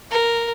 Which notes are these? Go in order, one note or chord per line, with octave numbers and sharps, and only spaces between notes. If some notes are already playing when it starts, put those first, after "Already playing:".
A#4